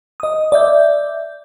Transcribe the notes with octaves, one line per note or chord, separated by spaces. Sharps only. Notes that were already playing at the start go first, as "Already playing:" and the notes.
D#5 D#6
D5 E5 G6